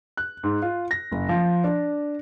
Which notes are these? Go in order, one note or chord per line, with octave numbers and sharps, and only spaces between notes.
F#6
G#2
F4
A#6
F#1
F3
D4